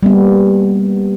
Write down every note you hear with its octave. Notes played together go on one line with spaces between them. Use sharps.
G3 A#3 B3